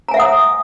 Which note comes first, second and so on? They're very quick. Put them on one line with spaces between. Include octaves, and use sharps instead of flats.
A#5 G#5 E5 F#5 D#6